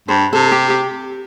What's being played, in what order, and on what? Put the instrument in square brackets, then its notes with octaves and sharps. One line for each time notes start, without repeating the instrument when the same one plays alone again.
[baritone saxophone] G2 [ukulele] C5
[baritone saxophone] C3 [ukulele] A4
[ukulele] G4
G4